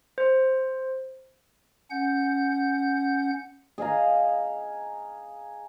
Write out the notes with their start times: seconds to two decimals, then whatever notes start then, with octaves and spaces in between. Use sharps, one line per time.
0.18 C5
1.90 C#4 F#5 G6
3.78 G#4 D#5 F5 A#5